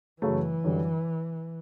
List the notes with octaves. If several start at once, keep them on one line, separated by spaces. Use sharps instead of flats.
F#2 C#3 E3 F#3 A3
F#2 D3 G3